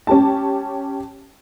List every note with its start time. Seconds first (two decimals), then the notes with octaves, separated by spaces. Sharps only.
0.07 C#4 G4 A5